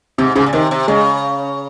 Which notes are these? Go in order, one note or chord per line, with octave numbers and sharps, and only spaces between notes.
G#2 C3
G#2 C#3
A#2
C3 D#3
C3
C#3 G#3